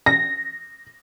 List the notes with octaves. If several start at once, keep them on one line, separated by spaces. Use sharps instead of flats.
A#6